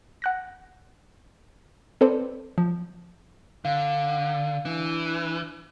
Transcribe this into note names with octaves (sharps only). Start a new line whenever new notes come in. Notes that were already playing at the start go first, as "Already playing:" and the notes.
F#5 F#6 A#6
C4 A4 B4 C5 D5
F3
D3 F5
E3 D4